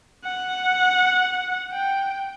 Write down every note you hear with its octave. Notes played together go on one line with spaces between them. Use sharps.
F#5
G5